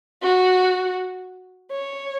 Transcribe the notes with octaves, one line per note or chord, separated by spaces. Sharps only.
F#4
C#5